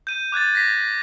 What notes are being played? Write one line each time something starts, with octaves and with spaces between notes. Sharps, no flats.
G6 D#7
D6 F#6 G#6 A6
A#6 B6